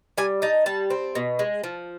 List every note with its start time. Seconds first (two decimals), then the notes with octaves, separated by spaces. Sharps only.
0.18 G3 G#5
0.42 D#4 A5
0.66 G3 A5
0.90 C4
1.15 B2
1.39 G#3
1.64 F3